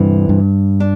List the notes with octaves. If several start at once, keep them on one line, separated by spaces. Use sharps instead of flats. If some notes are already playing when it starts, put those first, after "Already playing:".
Already playing: D2 G2 C3 E3
G2
D4